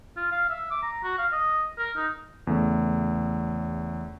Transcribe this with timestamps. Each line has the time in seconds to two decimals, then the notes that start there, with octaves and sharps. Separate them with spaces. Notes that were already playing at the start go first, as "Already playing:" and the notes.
0.17 F4
0.31 F5
0.50 E5
0.71 D6
0.83 A#5
1.03 F#4
1.18 F5
1.33 D#5
1.78 A#4
1.96 D#4
2.47 E2 C#3 A3